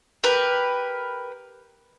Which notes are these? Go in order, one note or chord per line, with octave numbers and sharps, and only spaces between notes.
G4 A#4 B4